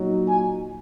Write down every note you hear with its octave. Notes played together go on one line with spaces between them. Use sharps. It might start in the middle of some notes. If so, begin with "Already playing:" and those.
Already playing: A#2 F#3 D#4
G#5